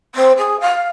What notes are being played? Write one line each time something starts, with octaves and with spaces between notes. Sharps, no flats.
C4
G#4
F5